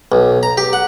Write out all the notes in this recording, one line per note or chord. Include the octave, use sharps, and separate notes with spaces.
B1
A#5
G4
F#5